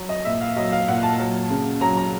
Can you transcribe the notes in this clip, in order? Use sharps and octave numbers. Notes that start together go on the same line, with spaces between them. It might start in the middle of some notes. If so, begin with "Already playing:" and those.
Already playing: F#3
D#5
A#2 E5
F5
F#3 D#5
F5
A#2 F#5
A5
F#3
C#3
F#3 A#5
A#5